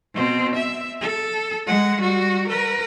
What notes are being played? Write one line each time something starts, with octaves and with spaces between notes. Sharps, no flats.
B2 C4
E5
A4
G#3 F#5
G3 F#4
A#4 B4